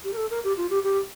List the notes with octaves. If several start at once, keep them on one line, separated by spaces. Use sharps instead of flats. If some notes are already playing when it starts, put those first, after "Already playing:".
G4
A#4
A4
A#4
G4
F4
G4
G4